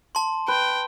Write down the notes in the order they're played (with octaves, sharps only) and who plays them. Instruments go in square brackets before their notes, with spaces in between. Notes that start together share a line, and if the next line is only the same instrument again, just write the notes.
[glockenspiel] A5 C6
[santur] B4 [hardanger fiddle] G5